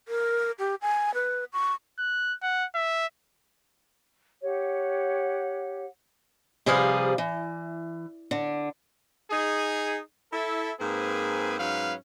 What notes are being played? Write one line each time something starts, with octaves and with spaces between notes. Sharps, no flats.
A#4
G4
G#5
B4
C#6
F#6
F#5
E5
G4 C#5 F#5
C3 F3 G3 G#4 B4 F5
E3
D3
D#4 G#4
E4 A4
G#2 A#3 C4 G#4 B4
G#2 F#3 C#4 B4 F5